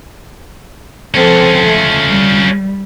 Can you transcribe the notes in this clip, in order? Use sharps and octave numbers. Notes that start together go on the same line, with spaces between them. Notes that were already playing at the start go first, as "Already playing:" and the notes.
F3 C4 C#4 F4 A4
A3
G3